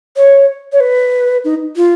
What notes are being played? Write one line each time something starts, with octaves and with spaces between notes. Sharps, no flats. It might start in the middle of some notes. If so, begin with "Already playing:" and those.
C#5
C#5
B4
D#4
F4